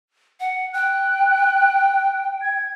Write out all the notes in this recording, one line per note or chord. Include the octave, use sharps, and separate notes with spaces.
F#5
G5 F#6
G#6